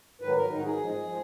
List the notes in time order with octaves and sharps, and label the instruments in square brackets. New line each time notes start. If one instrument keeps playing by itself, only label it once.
[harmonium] G#2 D#3 F#3 B4
A#4
G#2 D#3 F#3 D#4
G#4
G#2 F3 G#3
F3 G#3